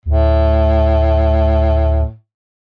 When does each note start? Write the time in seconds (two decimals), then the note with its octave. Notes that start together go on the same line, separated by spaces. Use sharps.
0.06 D2 A2